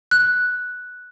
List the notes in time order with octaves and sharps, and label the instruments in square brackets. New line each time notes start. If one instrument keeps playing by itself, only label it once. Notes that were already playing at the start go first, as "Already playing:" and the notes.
[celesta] F#6